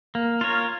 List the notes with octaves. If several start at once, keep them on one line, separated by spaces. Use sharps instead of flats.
A#3
F4 A#4 C#5